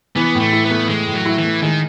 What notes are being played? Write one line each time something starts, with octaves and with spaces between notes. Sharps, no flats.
E3 B3
A2 A3
E4
B3
A3
E3 G#3
A2
F#3
E4
E3
A3
D#3 G#3